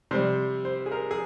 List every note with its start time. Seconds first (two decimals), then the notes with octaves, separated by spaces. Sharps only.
0.11 C3 G3 C5
0.65 C5
0.86 G#4
0.92 A#4
1.11 G#4